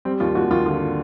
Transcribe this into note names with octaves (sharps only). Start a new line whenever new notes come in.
G3 C4
D#2 F4
D#2 F#4
D#2 F4
D3 F4